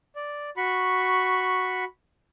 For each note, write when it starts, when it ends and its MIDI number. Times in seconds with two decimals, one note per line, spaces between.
0.16 0.50 74
0.57 1.84 66
0.57 1.84 83
0.57 1.84 85